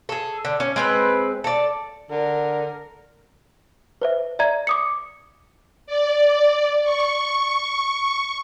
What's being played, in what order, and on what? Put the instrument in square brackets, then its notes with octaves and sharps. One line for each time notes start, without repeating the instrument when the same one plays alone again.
[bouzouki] G#4 A4
D3
C#4
G#3 C4 B4
A4 D5
[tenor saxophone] D3 [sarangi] A#4
[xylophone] B4 C5 E5
D5 E5 A#5 G#6
D6 D#6 C#7
[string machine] D5
C#6